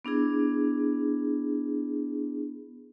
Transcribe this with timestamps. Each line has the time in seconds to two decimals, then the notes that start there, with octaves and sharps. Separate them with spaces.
0.05 B3 D4 E4 G#4